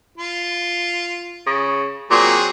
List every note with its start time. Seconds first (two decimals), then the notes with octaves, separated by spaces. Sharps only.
0.18 F4
1.47 C#3
2.11 A#2 F#3 C4 G#4